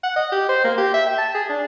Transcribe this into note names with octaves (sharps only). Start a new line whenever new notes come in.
F#5
D#5
G4
C5
A#3
G4
E5
G5
A5
G#4
D4